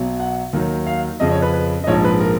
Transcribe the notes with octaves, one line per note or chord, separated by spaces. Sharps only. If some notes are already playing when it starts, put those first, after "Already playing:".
Already playing: B1 B2 F#3
F#5
D#2 D#3 F#3
F5
F2 C#3 F3 D#5
C#5
B4
B4
D#5
A#1 G#2 F3 C#5
B4
A#4